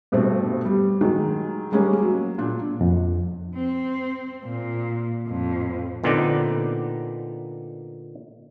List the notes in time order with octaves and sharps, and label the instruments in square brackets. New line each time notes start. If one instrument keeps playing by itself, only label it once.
[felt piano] G2 B2 A3 C4 D4
G3
D#3 F#3 G#3
G3 G#3 A#3 C#4
F#3
A#2 D4
[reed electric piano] F2
[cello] C4
A#2
F2 A2
[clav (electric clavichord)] A#2 D3 B3 C4 D#4 D5